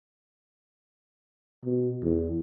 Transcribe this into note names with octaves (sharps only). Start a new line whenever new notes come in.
B2
E2